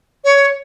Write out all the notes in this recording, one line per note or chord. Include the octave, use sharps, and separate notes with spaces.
C#5